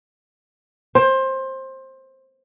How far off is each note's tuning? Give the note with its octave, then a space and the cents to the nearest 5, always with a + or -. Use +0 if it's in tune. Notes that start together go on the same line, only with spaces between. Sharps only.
C5 +20